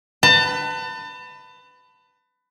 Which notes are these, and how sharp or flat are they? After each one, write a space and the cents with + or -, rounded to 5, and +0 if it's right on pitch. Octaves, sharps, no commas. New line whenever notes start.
B4 +20 A5 +35